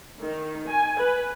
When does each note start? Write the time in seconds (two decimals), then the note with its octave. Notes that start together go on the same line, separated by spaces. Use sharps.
0.23 D#3
0.69 G#5
0.99 B4